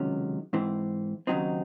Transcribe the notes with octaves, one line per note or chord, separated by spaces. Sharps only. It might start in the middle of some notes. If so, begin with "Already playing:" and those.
Already playing: C#2 C3 D#3 F#3 C#4
G#2 E3 C4
D#2 C#3 F#3 C4 D#4